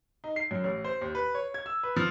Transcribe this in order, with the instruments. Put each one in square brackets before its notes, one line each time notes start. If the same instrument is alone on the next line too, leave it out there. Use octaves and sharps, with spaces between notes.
[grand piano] D#4
C7
F#2
A1
C5
D#2
B4
C#5
G#6
E6
B4
F3